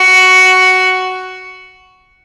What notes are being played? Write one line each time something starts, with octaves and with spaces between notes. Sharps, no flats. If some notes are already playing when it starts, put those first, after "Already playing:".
Already playing: F#4